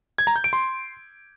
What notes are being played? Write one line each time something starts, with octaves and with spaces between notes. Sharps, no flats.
G#6
A#5
G6
D7
C6